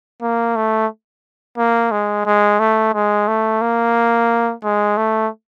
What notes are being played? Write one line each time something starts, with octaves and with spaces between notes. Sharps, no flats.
A#3
A3
A#3
G#3
G#3
A3
G#3
A3
A#3
G#3
A3